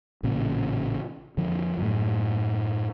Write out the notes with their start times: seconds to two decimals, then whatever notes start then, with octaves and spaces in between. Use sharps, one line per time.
0.23 A1 A#2 C#3
1.37 F2 D3 F3
1.77 F#2 A2